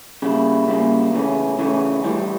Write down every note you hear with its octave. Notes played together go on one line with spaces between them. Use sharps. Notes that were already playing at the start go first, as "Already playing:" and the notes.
C#3 G3 A#3 E4
C#3 G3 A#3 E4
C#3 E3 A3 C#4
C#3 E3 A3 C#4
A2 E3 G3